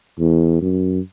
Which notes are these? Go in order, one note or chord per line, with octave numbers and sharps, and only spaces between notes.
E2
F#2